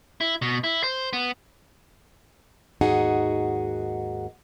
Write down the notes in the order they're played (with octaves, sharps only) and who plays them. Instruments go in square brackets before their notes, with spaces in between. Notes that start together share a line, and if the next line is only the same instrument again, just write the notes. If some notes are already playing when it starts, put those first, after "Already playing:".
[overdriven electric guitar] E4
B2
E4
C5
B3
[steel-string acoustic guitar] D#2 G#2 D#4 F#4 G#4 F#5